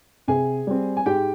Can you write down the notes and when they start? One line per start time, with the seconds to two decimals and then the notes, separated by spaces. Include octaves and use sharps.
0.28 C3 G#4 G#5
0.67 G3 C4
0.97 G#5
1.06 G#2 G4 G5